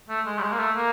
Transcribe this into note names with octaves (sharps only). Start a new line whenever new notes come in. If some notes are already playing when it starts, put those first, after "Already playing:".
A3
G#3
G3
G#3
A#3
A3
A#3